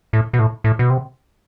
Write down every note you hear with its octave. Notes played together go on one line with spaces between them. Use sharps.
A2
B2
A2
A2
B2
C3